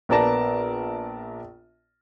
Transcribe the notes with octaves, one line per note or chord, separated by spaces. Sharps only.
A#1 B3 A#4 D5 A5 A#6